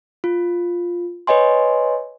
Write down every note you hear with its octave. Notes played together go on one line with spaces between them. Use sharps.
F4
B4 C#5 D#5 G#5 C6